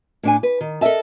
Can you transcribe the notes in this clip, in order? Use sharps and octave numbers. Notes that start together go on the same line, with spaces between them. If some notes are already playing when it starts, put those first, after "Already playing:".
A2 D4 G#5
B4
D#3
A4 A#4 D#5 E5 A5